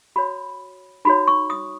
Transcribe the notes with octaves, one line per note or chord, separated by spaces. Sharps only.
F#4 C#5 B5
D#4 F#4 C#5 B5
C#6
D#6